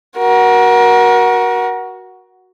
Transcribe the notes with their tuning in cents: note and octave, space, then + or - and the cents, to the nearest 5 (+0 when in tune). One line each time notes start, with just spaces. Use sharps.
F#4 +5 A#4 +30